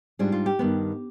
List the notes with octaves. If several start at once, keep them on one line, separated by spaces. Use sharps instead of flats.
G#2 G3 D4 F4 G#4
F4
G4
G2 D#3 B3